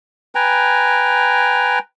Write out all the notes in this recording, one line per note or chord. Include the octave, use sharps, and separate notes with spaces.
B4 G5 G#5 A#5